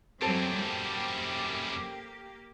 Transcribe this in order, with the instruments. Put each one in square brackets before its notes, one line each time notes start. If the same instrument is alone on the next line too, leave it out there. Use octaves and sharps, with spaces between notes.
[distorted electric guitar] F#2 G3 [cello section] F#3 C4 [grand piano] A4 C5 A5
[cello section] A#3 G4